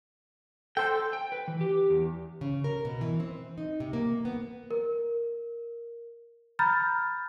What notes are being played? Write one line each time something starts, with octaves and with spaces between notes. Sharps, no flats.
A4 C5 G5
G5
B4
E3
G4
E2
C#3
A#4
B2
E3
C4
D#4
C3
A#3
B3
A#4
A#5 B5 F6 G6 A6